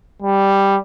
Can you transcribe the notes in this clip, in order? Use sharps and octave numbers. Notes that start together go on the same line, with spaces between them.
G3